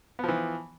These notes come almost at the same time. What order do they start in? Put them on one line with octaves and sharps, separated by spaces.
B3 F3 E3